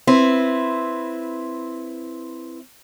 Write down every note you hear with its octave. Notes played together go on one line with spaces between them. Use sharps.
C4 E4 B4